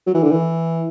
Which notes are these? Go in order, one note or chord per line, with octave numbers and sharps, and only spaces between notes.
F#3
E3
D3
E3